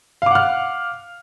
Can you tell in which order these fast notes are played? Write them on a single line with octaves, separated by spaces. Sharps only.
F5 D6 F#5 F6